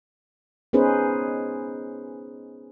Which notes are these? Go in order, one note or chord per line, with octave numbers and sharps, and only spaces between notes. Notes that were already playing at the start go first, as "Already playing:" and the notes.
B3 C#4 D#4 G#4 B4 C5